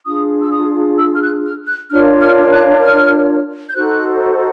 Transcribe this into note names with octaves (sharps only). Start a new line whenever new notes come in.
D4 F4 G#4 D#6
E6
D#6
E6
F6
F#6
F6
F#6
D4 F4 A#4 C#5 F6
F6
F#6
F6
G6
D#4 F#4 A4 C5 F#6